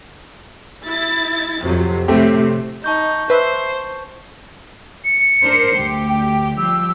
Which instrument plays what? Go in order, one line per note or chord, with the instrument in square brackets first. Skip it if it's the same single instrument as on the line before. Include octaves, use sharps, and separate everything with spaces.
[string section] E4 A6
F2 C3 F#3
[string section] A2 C3 [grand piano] A3 C4 G4
[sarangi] D#4 [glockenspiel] A5 C#6 G6
[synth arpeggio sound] B4 E5 [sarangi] C5
[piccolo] C#7
[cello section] D4 A#4 C5
D2 G4
[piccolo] G5
[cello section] F3 G3 G4 [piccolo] E6